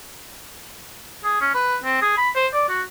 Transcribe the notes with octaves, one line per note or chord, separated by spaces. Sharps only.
G#4
C#4
B4
C4
G#4
B5
C5
D5
F#4